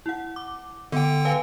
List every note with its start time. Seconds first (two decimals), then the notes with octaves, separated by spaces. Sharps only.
0.06 E4 F#5
0.36 D6
0.92 D3 B3 G5
1.25 B4 F5 G#5